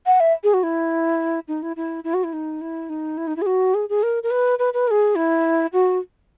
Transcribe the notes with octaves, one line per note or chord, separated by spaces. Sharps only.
F#5
E5
G#4
F#4
E4
D#4
E4
E4
E4
F#4
E4
D#4
E4
D#4
E4
D#4
E4
G#4
F#4
G#4
G#4
A#4
A#4
B4
B4
B4
A#4
G#4
E4
F#4